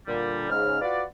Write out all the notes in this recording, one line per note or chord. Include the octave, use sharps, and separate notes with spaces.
A#2 D3 G3
G#2 C#3 F6
F4 F#4 B4 D5